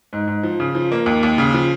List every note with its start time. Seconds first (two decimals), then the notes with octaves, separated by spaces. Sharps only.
0.13 G#2
0.27 G#2
0.43 F3
0.60 C#3
0.75 F3
0.92 A#3
1.06 D#2
1.23 D#2
1.38 C#3
1.54 F3